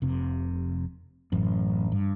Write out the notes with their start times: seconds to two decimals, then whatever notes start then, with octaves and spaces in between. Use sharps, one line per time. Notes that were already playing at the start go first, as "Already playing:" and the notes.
0.02 F1 C3
1.32 A1 F#2
1.92 G2